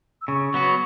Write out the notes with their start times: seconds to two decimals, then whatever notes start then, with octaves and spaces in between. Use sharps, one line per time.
0.22 E6
0.28 C#3 C#6
0.54 F#3 B3 F#4